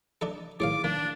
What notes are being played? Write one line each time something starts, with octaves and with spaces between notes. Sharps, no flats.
D4 D#4 A4
A2 D#3 G#4 C#5 F5 D6
D#3 A#3 D4